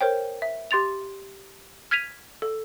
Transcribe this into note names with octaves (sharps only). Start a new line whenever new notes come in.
A#4 C5 C#5 G5
E5
G4 C6 A6 F7
F6 G#6 B6 D#7 F7
A4